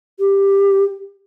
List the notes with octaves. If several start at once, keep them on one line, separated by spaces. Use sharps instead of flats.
G4